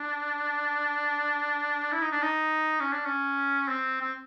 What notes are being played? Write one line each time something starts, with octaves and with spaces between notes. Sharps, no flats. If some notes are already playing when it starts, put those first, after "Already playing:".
Already playing: D4
E4
D#4
D4
D#4
C#4
D4
C#4
C4
C4